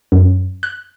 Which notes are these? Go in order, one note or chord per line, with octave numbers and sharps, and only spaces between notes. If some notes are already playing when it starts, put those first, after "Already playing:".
F#2
F#6